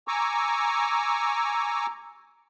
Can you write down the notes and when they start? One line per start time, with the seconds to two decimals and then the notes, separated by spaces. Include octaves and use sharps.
0.08 G#5 A#5 C#6 D6 E6